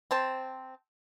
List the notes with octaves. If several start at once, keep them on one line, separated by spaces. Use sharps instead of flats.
C4 C5 A5